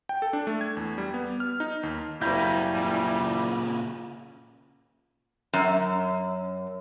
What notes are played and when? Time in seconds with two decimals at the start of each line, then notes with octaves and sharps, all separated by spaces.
0.09 G5
0.22 A4
0.33 D4
0.47 A3
0.61 G#6
0.77 E2
0.98 G3
1.14 B3
1.40 F6
1.60 D#4
1.83 D#2
2.22 F#1 G3 A#3 C#4 E4 C6 G6
2.75 A#2 C#3
5.53 F#2